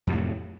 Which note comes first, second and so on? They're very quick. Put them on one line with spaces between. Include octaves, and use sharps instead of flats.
F2 C3 A2 F#3